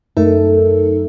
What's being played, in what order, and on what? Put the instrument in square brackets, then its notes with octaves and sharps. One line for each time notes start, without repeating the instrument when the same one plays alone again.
[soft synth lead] F#2 [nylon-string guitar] A3 [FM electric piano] D#4 A4 A#4